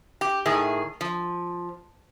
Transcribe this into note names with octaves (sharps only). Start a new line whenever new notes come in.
G4
A2 D#3 G#4
F3